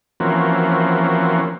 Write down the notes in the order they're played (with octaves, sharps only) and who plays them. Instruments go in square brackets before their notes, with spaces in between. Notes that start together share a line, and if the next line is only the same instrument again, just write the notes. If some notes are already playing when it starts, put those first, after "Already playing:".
[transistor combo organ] E3 F3 A#3 C4 C#4 F#4